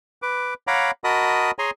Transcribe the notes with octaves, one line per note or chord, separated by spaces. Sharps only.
B4 D6
C#5 F5 F#5 A#5 B5 D6
F#4 A#4 D#5 A5 B5 D#6
G#4 C#5 G#5 A#5 C6